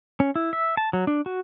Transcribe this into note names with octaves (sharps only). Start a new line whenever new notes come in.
C#4
E4
E5
A5
F#3
D4
F#4